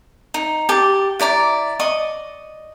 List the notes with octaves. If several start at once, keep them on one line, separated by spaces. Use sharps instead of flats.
D#4
G4 A5 D6
E4 D5 A#5 D6
D5 D#5 C#6 D#6